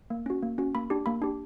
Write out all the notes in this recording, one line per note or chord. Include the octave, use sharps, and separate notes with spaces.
A#3
C#4 F#4
A#3
C#4 F#4
A#3 B5
D4 G4
A#3 B5
D4 G4